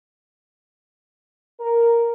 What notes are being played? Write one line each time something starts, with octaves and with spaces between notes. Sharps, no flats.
A#4